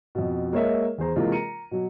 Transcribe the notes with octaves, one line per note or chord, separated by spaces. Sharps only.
F2 B2
G#3 A#3 A#4 C#5 D#5 E5
E2 G#4 C5 A#5
C3 E3 G#3 A#3 F4 A#4
A#5 C#7 D#7
B2 F#3